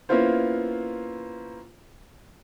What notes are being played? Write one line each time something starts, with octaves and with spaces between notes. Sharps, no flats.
A#3 B3 C#4 E4 F4 C5